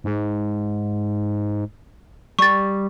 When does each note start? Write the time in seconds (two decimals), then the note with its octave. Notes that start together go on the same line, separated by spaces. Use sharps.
0.04 G#2
2.39 G3 C#6 A6